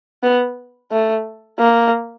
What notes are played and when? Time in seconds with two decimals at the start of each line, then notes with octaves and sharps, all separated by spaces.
0.23 B3
0.92 A3
1.59 A#3